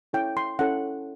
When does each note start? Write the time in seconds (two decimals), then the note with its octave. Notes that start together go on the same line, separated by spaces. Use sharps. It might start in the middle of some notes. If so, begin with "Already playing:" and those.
0.13 C#4 E4 A4 C#5 G5
0.37 C6
0.59 C#4 E4 A4 C#5 F#5